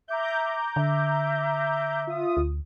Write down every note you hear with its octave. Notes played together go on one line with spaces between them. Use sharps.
E5 A#5 D6 G6
D3 E5
F4 D#6
D2